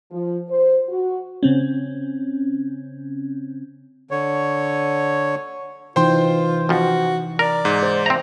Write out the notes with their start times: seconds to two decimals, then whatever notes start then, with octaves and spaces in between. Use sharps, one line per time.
0.12 F3
0.49 C5
0.89 F#4
1.43 C#3 C4 C#4
4.11 D3 C#5
5.96 C3 E3 D#4 F4 C5 G5 C6
6.69 F2 F3 F#4
7.39 A#4 D5 A#5
7.65 G#2
7.83 C5
8.06 C4 E5 A#5